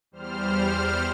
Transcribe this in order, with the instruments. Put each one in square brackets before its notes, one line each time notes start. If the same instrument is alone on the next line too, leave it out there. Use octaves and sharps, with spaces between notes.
[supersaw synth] E2 G3 C5 F6